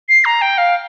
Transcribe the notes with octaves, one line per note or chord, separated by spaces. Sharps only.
C7
A#5
G5
F5